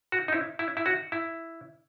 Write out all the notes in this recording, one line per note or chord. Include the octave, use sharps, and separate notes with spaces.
F#4
D#4
E4
E4
E4
F#4
E4